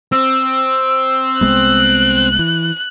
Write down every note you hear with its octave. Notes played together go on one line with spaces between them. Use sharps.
C4 E6
C2 G#3 B3 F#6
E3